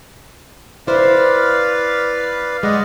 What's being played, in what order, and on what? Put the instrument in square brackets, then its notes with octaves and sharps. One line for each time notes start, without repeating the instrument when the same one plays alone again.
[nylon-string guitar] E4 C5 [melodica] B4 D5 F5
[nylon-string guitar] G#3 [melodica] D5 D#5 F#5